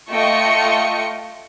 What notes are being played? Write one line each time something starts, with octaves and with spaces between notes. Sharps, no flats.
A3 F4 D#5 G5 C#6 C#7